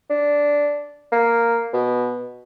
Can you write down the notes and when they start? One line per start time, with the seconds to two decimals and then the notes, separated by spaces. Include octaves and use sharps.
0.10 D4
1.12 A#3
1.74 B2